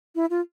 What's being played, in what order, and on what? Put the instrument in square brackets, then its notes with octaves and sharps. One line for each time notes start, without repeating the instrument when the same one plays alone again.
[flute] E4
F4